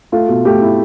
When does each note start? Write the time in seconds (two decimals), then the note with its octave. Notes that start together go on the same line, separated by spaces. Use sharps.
0.12 A3 F4
0.29 B2
0.45 A3 G4
0.62 E4